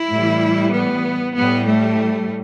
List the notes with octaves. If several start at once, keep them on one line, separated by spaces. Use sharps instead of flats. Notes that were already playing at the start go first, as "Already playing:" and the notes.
Already playing: E4
A2 E3 G3
B3
A2 G3 B3
A3